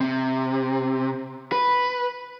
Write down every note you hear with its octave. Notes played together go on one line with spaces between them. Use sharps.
C3
B4